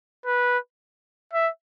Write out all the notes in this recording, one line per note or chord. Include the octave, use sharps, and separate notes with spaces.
B4
E5